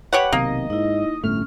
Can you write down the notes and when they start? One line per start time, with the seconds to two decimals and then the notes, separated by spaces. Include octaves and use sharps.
0.13 G4 B4 C#5 F#5
0.33 B1 C3 D#3 A#3 D#5
0.70 G#2 D#4 E4
1.24 G1 A2 A3 C#4 F6